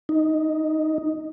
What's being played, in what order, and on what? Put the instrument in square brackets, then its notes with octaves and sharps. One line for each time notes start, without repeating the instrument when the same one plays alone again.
[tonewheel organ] D#4